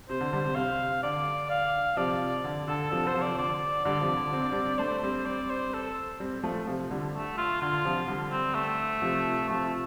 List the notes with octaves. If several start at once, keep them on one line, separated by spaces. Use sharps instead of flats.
C3 C5
D3
D3 G3
C3
C3 F5
D3 D5
F5
C3 F3 D5
D3
D3 A4
C3 F3 A4
C5
C3 F3
D5
D3 D5
D3 G3 D5
C3 F3
D3
C4
D4
G3 C4
A3 D4 C5
G3 C4
D5
C5
A4
G3 C4
F3 A3
C3 F3
D3 G3
A3
F4
D3 F4
C3 F3
D3 G3
C4
A3
C3 F3
C3 F3 A3